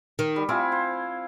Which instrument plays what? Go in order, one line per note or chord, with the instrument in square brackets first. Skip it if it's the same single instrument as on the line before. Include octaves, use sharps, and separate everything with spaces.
[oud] D#3
[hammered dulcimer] G3
[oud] C4 [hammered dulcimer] E4 F4 G#5
[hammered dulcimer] C5